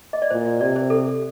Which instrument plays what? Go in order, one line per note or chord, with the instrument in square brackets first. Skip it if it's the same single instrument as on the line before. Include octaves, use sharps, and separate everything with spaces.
[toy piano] D#5
D5
[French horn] A#2 [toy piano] C5
[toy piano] D5
[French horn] C3 [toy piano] D5
[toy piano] C5
A4